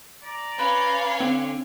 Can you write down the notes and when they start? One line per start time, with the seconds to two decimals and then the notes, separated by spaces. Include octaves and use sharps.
0.24 D5 A#5
0.59 C#4 B4 C#5 F5
1.20 D3 C4